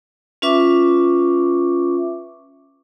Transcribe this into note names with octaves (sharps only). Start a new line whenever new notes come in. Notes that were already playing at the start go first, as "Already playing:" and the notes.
C#4 F4 B4 E5 C#6 D6